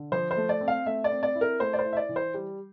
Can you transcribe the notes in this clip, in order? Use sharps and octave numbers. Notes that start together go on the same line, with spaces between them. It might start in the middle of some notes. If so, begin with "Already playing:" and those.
Already playing: D3
F3 C5
C5
A3
D5
C4
F5
A3 E5
D5
C4
D5
E4
A#4
A3 C5
D5
C5
E4
E5
D5
E3
C5
G3